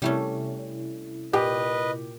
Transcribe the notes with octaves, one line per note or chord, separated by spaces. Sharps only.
C3 G3 A3 C#4 E4
A#2 G4 B4 D#5